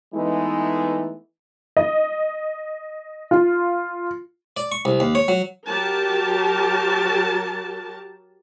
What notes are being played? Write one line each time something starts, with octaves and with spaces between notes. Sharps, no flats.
E3 G#3 A3 B3 D#4
D#5
F4
D5
C#6
C2
D#2
C#5
F#3
F#3 G4 A#4 A5